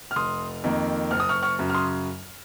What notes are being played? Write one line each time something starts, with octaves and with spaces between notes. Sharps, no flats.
F6
F1 C6 D#6
F2 D#3 A#3
F#1 F6
D#6
C#6 F6
C#6 F6
F#2 C#3
F6
C6 D#6